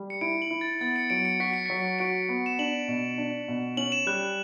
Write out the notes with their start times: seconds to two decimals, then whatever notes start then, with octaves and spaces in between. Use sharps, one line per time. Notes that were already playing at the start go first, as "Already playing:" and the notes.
Already playing: G3
0.10 C#7
0.21 E4 D7
0.42 F#7
0.51 E4
0.61 A6
0.81 B3 A6
0.96 C#7
1.10 F#3 D7
1.25 C#7
1.40 F#4 B6
1.54 C#7
1.66 F#3 B6
1.99 F#4 D7
2.29 B3
2.46 E7
2.59 D4 F#7
2.88 B2
3.18 D4
3.48 B2
3.77 C#4 F#7
3.92 E7
4.06 G3 F#6